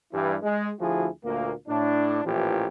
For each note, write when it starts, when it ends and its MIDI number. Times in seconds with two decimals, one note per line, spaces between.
0.13 0.36 43
0.13 0.36 52
0.13 0.36 55
0.13 0.36 64
0.43 0.71 56
0.80 1.07 38
0.80 1.07 53
0.80 1.07 64
0.80 1.07 66
0.80 1.07 68
1.24 1.52 38
1.24 1.52 46
1.24 1.52 58
1.68 2.23 45
1.68 2.23 62
2.24 2.66 33
2.24 2.66 46
2.24 2.66 52
2.24 2.66 53
2.24 2.66 67